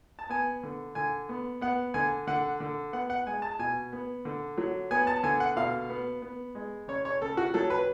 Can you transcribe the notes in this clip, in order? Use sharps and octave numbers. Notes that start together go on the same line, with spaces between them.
A5
B3 G#5
D3
D3 G#5
B3
B3 F#5
D3 G#5
D3 F#5
D3
B3 F#5
F#5
G#3 G#5
A5
B2 G#5
B3
D3
F#3
B3 G#5
A5
D3 G#5
F#5
B2 F5
B3
B3
G#3
C#3 C#5
C#5
C#3 A4
F#4
F#3 A4
B4